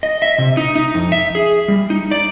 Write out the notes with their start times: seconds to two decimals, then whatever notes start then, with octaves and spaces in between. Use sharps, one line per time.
0.03 D#5
0.22 E5
0.38 C3
0.57 D#4
0.76 D#4
0.95 F2
1.12 E5
1.35 G#4
1.68 G3
1.90 D#4
2.11 D5